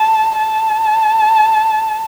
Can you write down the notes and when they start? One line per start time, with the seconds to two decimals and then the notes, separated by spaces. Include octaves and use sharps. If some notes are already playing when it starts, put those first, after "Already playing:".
Already playing: A5
0.39 A5